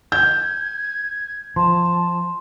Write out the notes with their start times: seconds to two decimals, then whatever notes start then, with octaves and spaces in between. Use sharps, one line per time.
0.12 G6 G#6
1.56 F3 A5 C6